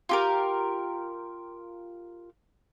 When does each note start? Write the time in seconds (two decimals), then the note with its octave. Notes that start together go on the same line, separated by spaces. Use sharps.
0.09 F4 G4 A#4